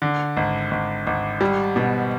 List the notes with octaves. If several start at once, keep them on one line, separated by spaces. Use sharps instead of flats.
D3
G#1
G#1
G#1
G3
B2